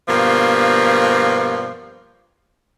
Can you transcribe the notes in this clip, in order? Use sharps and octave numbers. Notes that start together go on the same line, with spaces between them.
G2 B2 F3 A#3